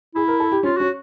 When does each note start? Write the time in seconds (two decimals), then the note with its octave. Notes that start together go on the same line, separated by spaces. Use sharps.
0.15 E4 G#4
0.28 A#4
0.40 A4
0.52 G4
0.63 C#4 F4
0.77 C#4 F#4